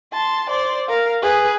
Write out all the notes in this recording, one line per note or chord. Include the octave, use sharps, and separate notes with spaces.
A5 C6
C5 D5
A#4 F5
G#4 B4